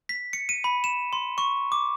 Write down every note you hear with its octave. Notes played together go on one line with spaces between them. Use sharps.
B6
C#7
D#7
B5
E7
C6
C#6
D6